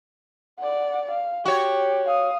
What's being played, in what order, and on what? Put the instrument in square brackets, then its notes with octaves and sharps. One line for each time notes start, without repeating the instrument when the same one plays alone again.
[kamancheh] D5 F#5
F5
[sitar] F#4 C#5 [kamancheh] G4
[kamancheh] F5 D#6